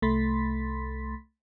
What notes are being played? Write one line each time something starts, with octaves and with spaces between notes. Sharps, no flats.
C2 A3 B5 C6 A6 B6